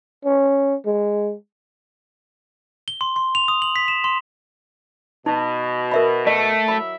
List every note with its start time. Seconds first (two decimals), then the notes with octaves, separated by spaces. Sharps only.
0.25 C#4
0.86 G#3
2.88 G7
3.01 C6
3.16 C6
3.35 F7
3.48 D#6
3.62 F#7
3.76 B6
3.88 E7
4.04 C6
5.26 B2 D#4
5.91 A#4 E5 B5
6.27 A3 D#5
6.68 F#3 E4 E5 B5